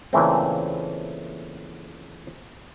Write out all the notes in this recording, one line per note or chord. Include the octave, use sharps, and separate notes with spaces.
A#2 C#3 E3 A3 C4